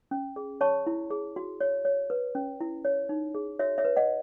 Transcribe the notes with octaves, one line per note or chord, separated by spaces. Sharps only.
C#4
G#4
C#5 A5 C#6
E4
G#4
F#4
C#5
C#5
B4
C#4
E4
C#5
D#4
G#4
F#4 C#5 E5
C#5 E5
B4
D#5 F#5